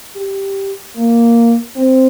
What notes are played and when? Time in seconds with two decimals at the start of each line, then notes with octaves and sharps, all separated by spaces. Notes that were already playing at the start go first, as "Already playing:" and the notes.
0.16 G4
0.95 A#3
1.76 C4